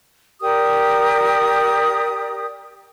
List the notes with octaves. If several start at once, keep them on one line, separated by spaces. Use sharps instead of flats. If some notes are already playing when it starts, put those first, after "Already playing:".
G4 A#4 D5 D#6